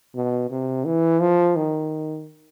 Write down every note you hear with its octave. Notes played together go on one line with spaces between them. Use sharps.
B2
C3
E3
F3
D#3